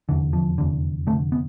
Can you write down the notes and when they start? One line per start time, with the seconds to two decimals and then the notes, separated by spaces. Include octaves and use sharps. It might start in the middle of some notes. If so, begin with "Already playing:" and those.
0.09 F1 E2 D3 E3
0.33 F3
0.58 F1 E2 D3
1.07 F1 E2 D3 A3
1.32 B3